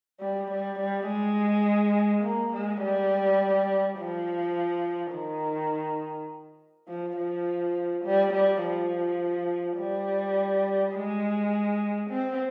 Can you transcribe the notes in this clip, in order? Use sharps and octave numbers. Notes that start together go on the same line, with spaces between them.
G3
G3
G3
G#3
A#3
G#3
G3
F3
D#3
F3
F3
G3
G3
F3
G3
G#3
C4